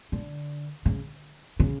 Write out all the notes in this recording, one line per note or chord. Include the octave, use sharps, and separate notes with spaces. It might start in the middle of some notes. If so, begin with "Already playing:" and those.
D3
C#3
C#3